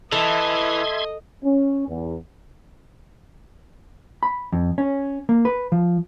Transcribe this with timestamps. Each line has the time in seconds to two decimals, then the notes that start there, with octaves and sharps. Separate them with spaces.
0.12 E3 A4 D#5 E5 C6 G#6
1.43 C#4
1.89 E2
4.23 B5
4.53 F2
4.78 C#4
5.29 A#3
5.45 B4
5.72 F3